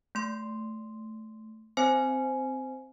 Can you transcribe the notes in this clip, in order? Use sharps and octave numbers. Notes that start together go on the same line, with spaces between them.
A3 C6
C4 C5 G#5